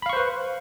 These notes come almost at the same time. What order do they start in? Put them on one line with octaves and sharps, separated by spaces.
B5 F5 C#6 C5 B4